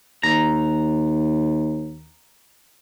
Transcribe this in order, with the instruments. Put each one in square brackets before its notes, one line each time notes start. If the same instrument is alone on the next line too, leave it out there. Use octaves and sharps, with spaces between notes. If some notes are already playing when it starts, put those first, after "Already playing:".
[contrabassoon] D#2 [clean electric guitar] A#5